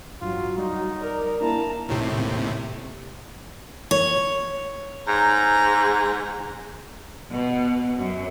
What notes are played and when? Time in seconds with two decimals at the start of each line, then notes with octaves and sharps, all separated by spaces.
0.22 A1 G2 F#3 F4
0.58 G3 D#4
1.00 A#4 D5
1.41 A#3 D4 E4 A5 A#5
1.89 D#2 A2 C3
3.91 C#5
5.08 G#2 A#5
7.32 B2
7.97 F#2